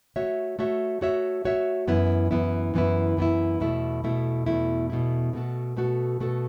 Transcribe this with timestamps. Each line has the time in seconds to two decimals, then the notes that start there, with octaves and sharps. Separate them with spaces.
0.16 A3 F#4 C#5 E5
0.59 A3 F#4 C#5 E5
1.01 A3 F#4 C#5 E5
1.44 A3 F#4 C#5 E5
1.88 F#2 E3 B3 E4
2.31 F#2 E3 B3 E4
2.74 F#2 E3 B3 E4
3.17 F#2 E3 B3 E4
3.60 E2 B2 A3 E4
4.04 E2 B2 A3 E4
4.46 E2 B2 A3 E4
4.90 E2 B2 A3 E4
5.33 B2 A3 F#4 A4
5.77 B2 A3 F#4 A4
6.20 B2 A3 F#4 A4